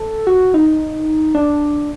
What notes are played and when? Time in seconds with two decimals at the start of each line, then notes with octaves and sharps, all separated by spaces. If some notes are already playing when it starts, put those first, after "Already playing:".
Already playing: A4
0.27 F#4
0.54 D#4
1.35 D4